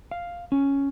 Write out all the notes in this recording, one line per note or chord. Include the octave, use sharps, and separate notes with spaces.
F5
C#4